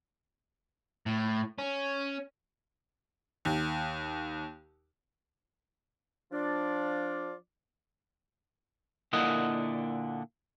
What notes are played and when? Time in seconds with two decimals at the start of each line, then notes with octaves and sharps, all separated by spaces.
1.06 A2
1.58 C#4
3.45 D#2
6.32 F3 D4 F4 D5
9.13 A#2 D3 A#3 E4 D#5 F#5